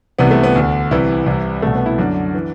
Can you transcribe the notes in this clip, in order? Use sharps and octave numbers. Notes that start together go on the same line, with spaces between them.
C2 C3 E3 B3
A3
B3
D2 D3
C2 C3 E3 E4
C2 C3 E3
C2 B2 A3
B3
E4
F#2 D3 D4
E3